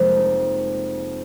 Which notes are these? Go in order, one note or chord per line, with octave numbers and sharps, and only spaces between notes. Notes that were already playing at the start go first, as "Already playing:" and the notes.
Already playing: F1 F2 F3 G#3 A#3
D#4